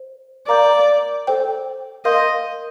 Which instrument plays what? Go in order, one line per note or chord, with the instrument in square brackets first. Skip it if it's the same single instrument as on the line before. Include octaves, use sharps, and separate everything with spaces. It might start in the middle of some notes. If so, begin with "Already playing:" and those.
Already playing: [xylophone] C5
[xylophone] A#4 F5 A#5 D6 G6 [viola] D5
[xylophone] A4 C5 G5
[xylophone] A#4 F5 C6 G6 [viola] D#5